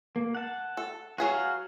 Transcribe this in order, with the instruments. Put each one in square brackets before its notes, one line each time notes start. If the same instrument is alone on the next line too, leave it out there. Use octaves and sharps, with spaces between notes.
[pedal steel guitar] A#3
F#5 A5
[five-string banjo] A4
[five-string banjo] F#3 G#4 B4 [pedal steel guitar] F#4 F5